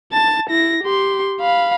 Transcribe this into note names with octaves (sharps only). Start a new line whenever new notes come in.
A5 A6
E4 A#6
G4 C6
F5 B5